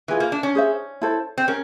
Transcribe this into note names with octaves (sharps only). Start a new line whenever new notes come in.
E3 F4 G#4 B4
A#3
D4
C#4
G#4 C5 E5
E4 A4 C5
C4
C#4 A#4